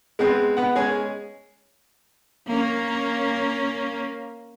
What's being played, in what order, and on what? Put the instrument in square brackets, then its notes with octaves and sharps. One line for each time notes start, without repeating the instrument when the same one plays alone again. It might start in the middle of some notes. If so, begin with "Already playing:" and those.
[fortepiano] G#3 B3 C4
B3 F#5
G#3 C#4 G#4
[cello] A#3 C#4